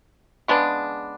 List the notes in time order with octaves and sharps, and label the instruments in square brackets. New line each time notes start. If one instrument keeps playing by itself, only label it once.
[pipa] C#3 G#3 B3 D4